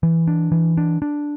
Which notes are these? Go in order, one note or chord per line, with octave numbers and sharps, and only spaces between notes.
E3
D4
E3
D4
D4